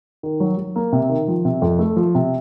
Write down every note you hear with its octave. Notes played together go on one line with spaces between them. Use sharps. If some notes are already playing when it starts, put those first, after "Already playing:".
D#3
F#3
F#3
A#3
C3
D#3
F3
C3
F2
A3
F3
C3